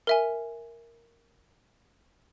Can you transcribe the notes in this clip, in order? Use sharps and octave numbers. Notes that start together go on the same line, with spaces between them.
A#4 E5 G#5